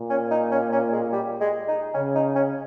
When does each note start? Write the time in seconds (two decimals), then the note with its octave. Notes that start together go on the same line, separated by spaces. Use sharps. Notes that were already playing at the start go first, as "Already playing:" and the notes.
Already playing: A#2
0.10 C#4
0.31 D#4
0.51 C#4
0.72 C#4
0.92 G#3
1.12 G3
1.40 G#3
1.68 D#4
1.94 C#3 C#4
2.15 D#4
2.36 C#4